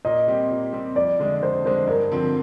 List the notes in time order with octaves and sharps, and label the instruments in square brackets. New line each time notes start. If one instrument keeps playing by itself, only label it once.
[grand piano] A#2 [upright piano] D#5
[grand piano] G3 C4 G4
A#2
G3 C4 G4
[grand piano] F2 [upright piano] D5
[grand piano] D3 G#3 D4
[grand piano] F2 [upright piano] C5
[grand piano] D3 G#3 D4 [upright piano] C5
[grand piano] G2 [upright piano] A#4
[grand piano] D3 F3 C4